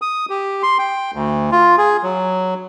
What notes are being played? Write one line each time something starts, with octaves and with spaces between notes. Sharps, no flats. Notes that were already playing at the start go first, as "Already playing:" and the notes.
D#6
G4
C6
G5
D2
F4
G#4
F#3